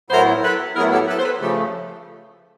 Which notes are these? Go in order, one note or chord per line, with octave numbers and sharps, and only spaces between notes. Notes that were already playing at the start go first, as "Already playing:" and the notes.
A2 F#3 B3 E4 A#4 C5
A4 B4
A2 F#3 B3 E4 G#4 A#4
G4 A4
A4 B4
C5
A4 B4
C#3 F3 A3 G4 A4